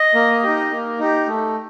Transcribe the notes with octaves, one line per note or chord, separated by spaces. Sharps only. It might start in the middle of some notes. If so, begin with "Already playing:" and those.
Already playing: D#5
A#3
D#4 G4
A#3
D#4 G4
A3